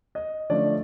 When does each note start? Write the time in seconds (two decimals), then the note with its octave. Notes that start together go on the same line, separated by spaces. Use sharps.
0.15 D#5
0.50 D3 F3 A3 C#4 D5